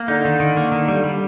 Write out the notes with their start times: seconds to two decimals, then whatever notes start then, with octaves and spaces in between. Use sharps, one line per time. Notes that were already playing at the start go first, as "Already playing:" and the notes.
Already playing: A#3
0.08 D3 D#4
0.25 D#3
0.40 D#3
0.57 A#3
0.72 D#3
0.88 G3
1.04 G3